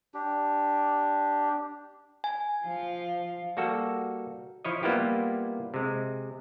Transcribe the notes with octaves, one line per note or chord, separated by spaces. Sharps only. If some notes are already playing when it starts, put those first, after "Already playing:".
D4 G4
G#5
F3 F4
G3 A#3 F#4 A4
F3 E4 C#5 D#5
G3 A#3 B3 E4 F4 G4
C3 G#3